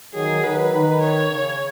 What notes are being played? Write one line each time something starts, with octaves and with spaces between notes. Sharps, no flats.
D#3 F#3 G#4
D#3 F#3 B4
D#3
C#5
C#3